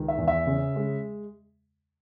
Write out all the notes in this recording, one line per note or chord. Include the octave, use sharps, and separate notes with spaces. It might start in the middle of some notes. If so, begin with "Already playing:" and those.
Already playing: C#2 D#3
E5
E2
E5
C#3
G#3